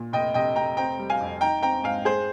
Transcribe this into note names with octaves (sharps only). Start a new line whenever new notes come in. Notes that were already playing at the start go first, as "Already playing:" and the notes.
Already playing: A#2
F1 D#5 G5
C3 D#5 G5
F1 G5 A#5
C4 G5 A#5
G3
F5 G#5
F2
D#4 G5 A#5
C4 G5 A#5
G#2 F5 G#5
G#3 G#4 C5